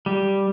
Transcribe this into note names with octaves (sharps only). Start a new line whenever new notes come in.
G3